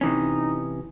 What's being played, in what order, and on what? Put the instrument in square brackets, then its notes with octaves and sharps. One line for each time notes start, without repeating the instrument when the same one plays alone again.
[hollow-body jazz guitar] C3 E3 C#4 [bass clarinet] D#4